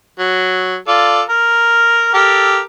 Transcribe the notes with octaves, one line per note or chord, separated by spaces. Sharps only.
F#3
F4 A4 D5
A#4
G4 A4 A#4